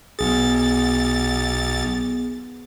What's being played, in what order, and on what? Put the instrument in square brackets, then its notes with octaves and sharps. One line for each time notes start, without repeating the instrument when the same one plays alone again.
[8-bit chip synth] B1 A6 [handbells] B3 G#4